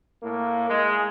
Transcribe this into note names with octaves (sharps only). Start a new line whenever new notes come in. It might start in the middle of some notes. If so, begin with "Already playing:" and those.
A2 A#3
G#3